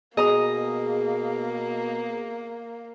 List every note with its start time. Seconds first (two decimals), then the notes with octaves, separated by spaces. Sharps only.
0.17 B2 A#3 G#4 D#5 A#5 D#6